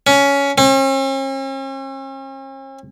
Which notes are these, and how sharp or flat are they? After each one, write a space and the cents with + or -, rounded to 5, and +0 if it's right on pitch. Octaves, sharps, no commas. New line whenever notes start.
C#4 +15
C#4 -45